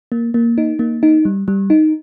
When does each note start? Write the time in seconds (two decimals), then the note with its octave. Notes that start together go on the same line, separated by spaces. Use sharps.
0.12 A#3
0.34 A#3
0.58 D#4
0.79 A#3
1.03 D#4
1.25 G3
1.48 G3
1.70 D#4